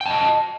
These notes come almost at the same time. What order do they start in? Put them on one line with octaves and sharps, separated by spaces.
G5 A5 D#5